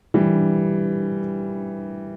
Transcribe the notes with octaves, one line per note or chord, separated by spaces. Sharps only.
E3 G3